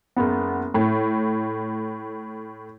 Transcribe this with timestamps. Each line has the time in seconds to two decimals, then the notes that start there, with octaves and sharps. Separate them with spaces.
0.16 F#1 B3
0.74 A2